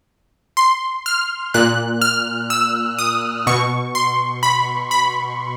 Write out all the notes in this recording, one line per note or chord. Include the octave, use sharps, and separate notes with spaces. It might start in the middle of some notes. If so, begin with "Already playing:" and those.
C6
F6
A#2 F#6
F6
E6
D#6
B2 C#6
C6
B5
B5